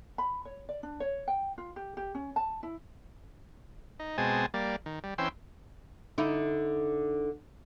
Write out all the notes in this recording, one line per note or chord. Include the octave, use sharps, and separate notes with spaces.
B5
C#5
D5
D4
C#5
G5
F4
G4
G4
C#4
A5
E4
D#4
B2 G#3 C4 G#5 A5 D#6
G3 A#3 D5
D#3
G3
E3 C4 C#4 G5 C6 E6
D3 D#4 E4